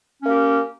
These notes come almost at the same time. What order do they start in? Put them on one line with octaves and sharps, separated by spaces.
C#4 A#3 G4